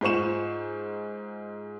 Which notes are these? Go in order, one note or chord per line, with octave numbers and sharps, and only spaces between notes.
G#2 F4 C5 C#6 E7